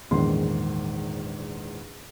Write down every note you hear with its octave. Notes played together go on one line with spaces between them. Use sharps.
A#1 E2 G#2 D#3 C6